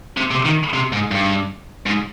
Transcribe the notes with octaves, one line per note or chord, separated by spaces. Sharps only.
C3
C3
D#3
C3
G#2
G2
G#2